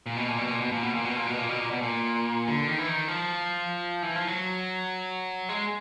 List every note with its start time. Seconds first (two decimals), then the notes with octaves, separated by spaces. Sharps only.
0.06 A#2
0.17 B2
0.28 A#2
0.38 B2
0.50 A#2
0.61 B2
0.72 A#2
0.83 B2
0.94 A#2
1.05 B2
1.16 A#2
1.27 B2
1.38 A#2
1.49 B2
1.60 A#2
1.71 B2
1.81 A#2
2.47 D3
2.67 D#3
2.79 E3
2.88 D#3
3.08 F3
4.03 E3
4.16 F3
4.28 F#3
5.49 G#3